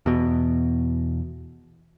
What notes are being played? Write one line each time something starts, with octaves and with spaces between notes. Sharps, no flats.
E2 B2